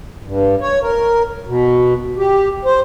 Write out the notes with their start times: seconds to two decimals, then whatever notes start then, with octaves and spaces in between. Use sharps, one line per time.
0.24 G2
0.61 C#5
0.82 A#4
1.47 B2
2.17 G4
2.65 C5